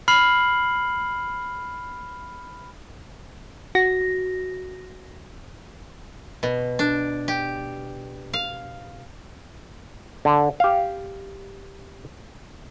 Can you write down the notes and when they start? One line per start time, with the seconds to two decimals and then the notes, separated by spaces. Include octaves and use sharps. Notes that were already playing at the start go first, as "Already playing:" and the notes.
0.08 B5 F6 C7 F#7
3.75 F#4 A#6
6.43 B2
6.79 D4
7.28 G4
8.33 F5
10.25 D3
10.60 G4 F5